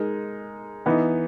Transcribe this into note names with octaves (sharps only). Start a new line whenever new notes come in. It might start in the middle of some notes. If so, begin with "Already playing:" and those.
Already playing: G#3 D#4 A#4
E3 B3 D#4